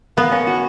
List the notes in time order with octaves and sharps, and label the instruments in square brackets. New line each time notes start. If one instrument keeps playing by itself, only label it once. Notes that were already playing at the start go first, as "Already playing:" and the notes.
[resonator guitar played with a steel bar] A#3 [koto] B3
[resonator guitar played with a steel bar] C#4
F#4